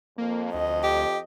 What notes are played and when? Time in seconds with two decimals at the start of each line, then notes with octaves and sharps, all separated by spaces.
0.18 F2 A#3
0.54 D2 D#5
0.83 G4